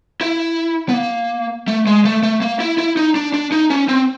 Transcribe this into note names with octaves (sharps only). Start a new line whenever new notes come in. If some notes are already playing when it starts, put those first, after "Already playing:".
E4
B3
A#3
A3
G#3
A3
A3
A#3
E4
E4
D#4
D4
D4
D#4
C#4
C4